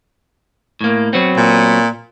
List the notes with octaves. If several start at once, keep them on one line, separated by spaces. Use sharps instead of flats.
A2 A#3
F#3 B3 C4
A#2